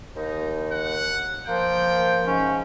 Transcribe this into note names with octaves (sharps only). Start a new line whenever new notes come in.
D#2 D#4
F#5
F3 A#3 G5
G#2 C#4